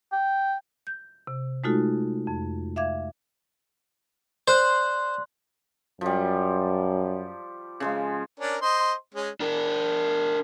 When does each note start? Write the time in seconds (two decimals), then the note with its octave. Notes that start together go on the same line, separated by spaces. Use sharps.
0.12 G5
0.87 G6
1.27 C3
1.64 G#3 A3 D#4 F4 F#4 A4
2.27 F2
2.76 E5 F5 D6 G#6
4.48 C5 D5 C6 F#6
6.01 F#2 F3 G3
7.80 C#3 F3 G#3
8.40 C#4 D4 A#4
8.62 C5 D#5 C6
9.14 G#3 C#4
9.40 D4 A#4